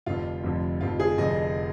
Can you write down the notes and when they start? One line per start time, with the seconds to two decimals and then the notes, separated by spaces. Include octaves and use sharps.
0.06 F1 F2 D3 F3 F4
0.44 F1 F2 D3 F3
0.81 F1 F2 D3 F3 F4
1.00 G#4
1.18 F1 F2 D3 F3 D#5